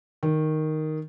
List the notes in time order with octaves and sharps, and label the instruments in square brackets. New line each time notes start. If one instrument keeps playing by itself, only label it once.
[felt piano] D#3